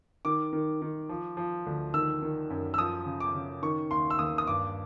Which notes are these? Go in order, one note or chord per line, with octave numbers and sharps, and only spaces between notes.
D#3 D6
D#3
D#3
F3
F3
D2
D#3 E6
D#3
F#2
E6
F3 D#6
C#3
D6
C#3
D#3 C#6
D#2 C6
E6
D#2 D#6
D#6
G2 D6